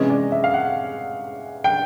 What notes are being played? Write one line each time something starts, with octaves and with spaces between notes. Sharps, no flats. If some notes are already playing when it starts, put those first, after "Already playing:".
Already playing: C3 E3 G#3 C#4 D#5
D5
E5
F5
F#5
G5